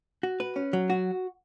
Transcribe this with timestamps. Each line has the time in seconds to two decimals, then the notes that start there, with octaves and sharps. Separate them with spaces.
0.23 F#4
0.40 B4
0.56 C#4
0.73 F#3
0.90 F#4